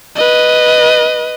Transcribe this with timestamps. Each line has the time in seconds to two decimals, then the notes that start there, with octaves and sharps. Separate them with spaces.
0.15 B4 D#5